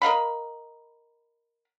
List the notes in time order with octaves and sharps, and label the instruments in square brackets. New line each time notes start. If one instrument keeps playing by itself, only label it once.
[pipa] A#4 D#5 F5 B5